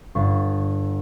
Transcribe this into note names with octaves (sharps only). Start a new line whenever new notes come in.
G1 C#6 A6 C7